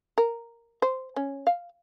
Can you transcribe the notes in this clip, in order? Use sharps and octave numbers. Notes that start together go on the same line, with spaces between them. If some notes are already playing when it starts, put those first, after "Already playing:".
A#4
C5
C#4
F5